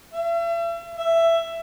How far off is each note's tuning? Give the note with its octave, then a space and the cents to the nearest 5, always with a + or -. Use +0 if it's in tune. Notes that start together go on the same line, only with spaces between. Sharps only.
E5 +40
E5 +15